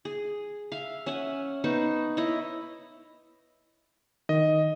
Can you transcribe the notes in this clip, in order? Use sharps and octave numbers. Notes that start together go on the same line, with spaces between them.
G#4
E5 F5
C#4 E5 F#5 G#5
B3 D#4 C5 C#6
E4 C#5 D#5
D#3 D#5